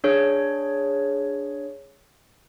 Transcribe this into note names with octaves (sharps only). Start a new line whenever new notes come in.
D4 G#4 C#5